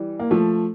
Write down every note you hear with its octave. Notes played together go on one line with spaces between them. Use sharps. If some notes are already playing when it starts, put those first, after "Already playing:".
Already playing: E3 G3
A#3
F3 A3